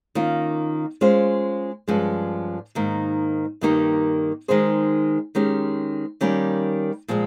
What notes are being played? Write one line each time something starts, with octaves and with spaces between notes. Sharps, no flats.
D#3 A#3 C#4 F4
G#3 C#4 F4 C5
G2 F3 G#3 C#4
G#2 D#3 A#3
G2 D#3 A#3 D#4 G4
D#3 G#3 D#4 G#4 C5
D#3 G#3 C#4 G4
D#3 G3 A#3 C#4
A#2 F3 G#3